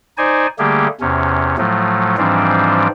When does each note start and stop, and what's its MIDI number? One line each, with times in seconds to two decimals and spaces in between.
0.18 0.47 63
0.18 0.47 72
0.18 0.47 74
0.18 0.47 80
0.59 0.88 50
0.59 0.88 55
0.59 0.88 57
0.59 0.88 58
0.59 0.88 67
0.59 0.88 68
1.01 1.56 40
1.01 1.56 48
1.01 1.56 61
1.58 2.16 45
1.58 2.16 53
1.58 2.16 54
1.58 2.16 57
2.17 2.88 44
2.17 2.88 52
2.17 2.88 53
2.17 2.88 55
2.17 2.88 60
2.17 2.88 62